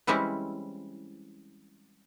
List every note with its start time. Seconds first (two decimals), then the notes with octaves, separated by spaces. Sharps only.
0.07 E3 G3 G#3 C4 C#4 E4